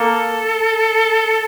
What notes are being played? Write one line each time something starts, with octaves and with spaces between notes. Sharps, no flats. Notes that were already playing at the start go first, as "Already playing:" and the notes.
Already playing: A#3 A4